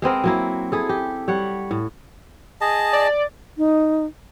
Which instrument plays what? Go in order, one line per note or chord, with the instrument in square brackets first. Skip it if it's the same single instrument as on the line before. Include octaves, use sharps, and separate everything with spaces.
[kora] G#3 B3 C4 A#4
F#3 A#3 E4
E4 G#4 A4
G4
G3 C#5 F#5
A2
[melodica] G#4 D#5 A5
[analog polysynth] D5
[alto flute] D#4